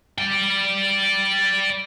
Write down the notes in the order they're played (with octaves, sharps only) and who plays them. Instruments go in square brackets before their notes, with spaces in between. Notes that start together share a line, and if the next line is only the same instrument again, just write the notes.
[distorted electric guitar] D5 G5